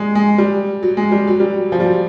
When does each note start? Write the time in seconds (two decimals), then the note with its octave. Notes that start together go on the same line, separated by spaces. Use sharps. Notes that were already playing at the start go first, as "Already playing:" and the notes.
Already playing: G3 G#3
0.15 G#3
0.38 G3
0.83 F#3
0.97 G#3
1.12 G3
1.27 F#3
1.40 G3
1.53 F#3
1.72 F3
1.80 G3
1.86 F#3